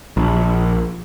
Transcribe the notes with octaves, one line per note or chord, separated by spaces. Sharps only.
A#1